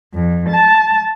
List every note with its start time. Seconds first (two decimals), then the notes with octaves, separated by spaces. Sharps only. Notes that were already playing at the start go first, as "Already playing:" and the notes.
0.15 F2
0.49 A5